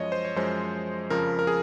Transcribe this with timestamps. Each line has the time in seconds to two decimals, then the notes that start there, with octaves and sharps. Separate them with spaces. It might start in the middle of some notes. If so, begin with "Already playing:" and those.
Already playing: F#2 F3 G#3 C#5 D#5
0.12 C5
0.25 C#5
0.36 F#2 F3 G#3 C5
1.10 F2 C#3 F3 A#4
1.39 A#4
1.47 G#4